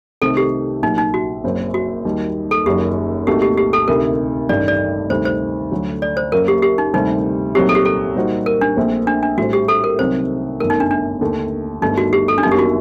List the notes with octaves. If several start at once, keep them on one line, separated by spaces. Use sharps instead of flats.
C2 C3 D#3 A3 C4 A4
G4
A#1 A#2 F#3 D#4
D#4
F#4
F#1 F#2 F#3 C4
F#4
D#2 D#3 G3
A4
F#1 F#2 D#3 F#3 G4
C2 A#2 A3 D#4 F#4 G4
G4
G4
A4
D2 C3 D#3 A#4
A1 G2 D#3 A3 D5
D5
D2 C3 D#3 G3 C5
C5
D2 D3 F#3
D5
C5
F#1 F#2 F#3 A#3 A#4
G4
G4
D#4
D2 C3 D#3 G3 C4 D#4
C2 A#2 F#3 C4 D#4 G4
A4
G4
A4
A#2 G3 C4 D#4 F#4
A#4
D4
A#1 A#2 A3 C4
D4
D4
A2 G3 C4 F#4
G4
A4
A#4
C2 C3 D#3 F#3 C5
G1 F#2 D#3 A3 A#4
D#4
D4
D4
D#2 D3 A3
G1 G2 D#3 A3 D#4
F#4
G4
A4
D4
G1 F#2 D#3 F#3 A#3 D#4
G4
F#4